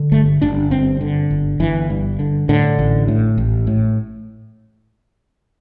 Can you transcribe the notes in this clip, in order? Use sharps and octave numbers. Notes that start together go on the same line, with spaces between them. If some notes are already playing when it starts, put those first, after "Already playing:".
Already playing: D3
G1 A3
G1 D4
G2 C4
D3
G1
G1 E3
G2
D3
A2 D3
A1
A2
A1
A2